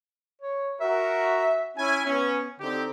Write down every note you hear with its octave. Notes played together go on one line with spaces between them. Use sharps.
C#5
F#4 A#4 E5
C#4 E4 G#5
B3 C#4
D3 C4 D#4 G4